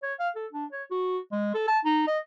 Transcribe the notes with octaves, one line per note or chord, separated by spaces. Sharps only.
C#5
F5
A4
D4
C#5
F#4
G#3
A4
A5
D#4
D#5